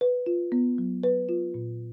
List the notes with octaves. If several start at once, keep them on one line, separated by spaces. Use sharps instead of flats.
B4
F4
B3
F#3
B4
F4
A#2